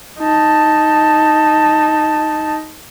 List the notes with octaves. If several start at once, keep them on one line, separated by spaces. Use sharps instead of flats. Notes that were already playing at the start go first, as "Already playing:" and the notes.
D#4 A5